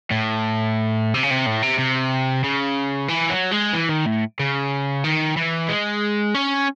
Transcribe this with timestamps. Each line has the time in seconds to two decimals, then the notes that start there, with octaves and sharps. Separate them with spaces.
0.11 A2
1.14 C3
1.23 C#3
1.30 C3
1.46 A2
1.62 C3
1.78 C3
2.44 C#3
3.09 E3
3.30 F#3
3.52 G#3
3.74 E3
3.90 D#3
4.06 A2
4.39 C#3
5.04 D#3
5.37 E3
5.69 G#3
6.35 C#4